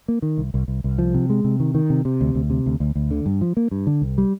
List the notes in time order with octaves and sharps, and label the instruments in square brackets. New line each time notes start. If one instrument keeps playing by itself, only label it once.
[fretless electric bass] A#3
D#3
C2
C2
C2
C2
F3
C3
G#3
C3
D#3
D#3
C3
C3
D2
D2
C3
D2
D2
D2
D3
G2
F3
A#3
G2
D3
C2
G3